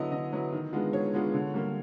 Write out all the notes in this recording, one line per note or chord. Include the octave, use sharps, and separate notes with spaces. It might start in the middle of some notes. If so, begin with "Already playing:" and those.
Already playing: D3 F#3 B3 E4 D#5
D3 D#5
F#3 B3 E4
D#3
G#3 B3 D4 F4
D#3 C#5
G#3 B3 D4 F4
D3
G3 A#3